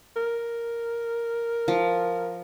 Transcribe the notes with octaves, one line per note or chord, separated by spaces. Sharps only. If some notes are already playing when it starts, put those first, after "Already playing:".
A#4
F3